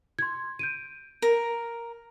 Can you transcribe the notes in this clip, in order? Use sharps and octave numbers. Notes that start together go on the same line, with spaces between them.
C6 G#6
G6 D7 D#7
A#4